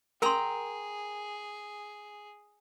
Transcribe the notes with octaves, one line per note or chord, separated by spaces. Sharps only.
G#4 A#4 G5 A#5 C6 D#6